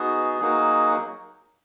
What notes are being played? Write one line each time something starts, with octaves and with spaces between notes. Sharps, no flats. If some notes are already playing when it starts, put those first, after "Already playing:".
Already playing: B3 D#4 F#4 G#4
F#3 A#3 D#4 F#4 G#4